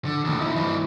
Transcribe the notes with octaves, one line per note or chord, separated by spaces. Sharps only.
D3
D#2 A2
D#4 E4
G2 E3